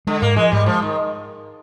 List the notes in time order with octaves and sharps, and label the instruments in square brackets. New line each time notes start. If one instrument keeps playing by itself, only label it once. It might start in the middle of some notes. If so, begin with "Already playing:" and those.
[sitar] D3 [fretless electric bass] G#3
[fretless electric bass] G#2 [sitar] A#3
[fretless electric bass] F3 [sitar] G#3
[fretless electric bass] G#2 [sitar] G3
[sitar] F3 [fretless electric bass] G#3
[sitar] D#3